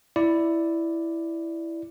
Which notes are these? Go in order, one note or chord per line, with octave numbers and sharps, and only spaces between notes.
E4 D5